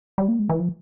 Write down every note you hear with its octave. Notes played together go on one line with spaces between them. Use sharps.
G3
A#3
G#3
E3
F3